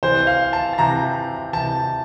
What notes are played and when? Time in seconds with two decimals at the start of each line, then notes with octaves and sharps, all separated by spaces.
0.03 C3 E3 C5
0.27 F5
0.53 A5
0.73 A5
0.78 C3 E3 A#5
1.53 C3 E3 A5